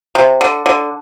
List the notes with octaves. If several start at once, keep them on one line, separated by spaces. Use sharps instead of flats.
C3
D3
D3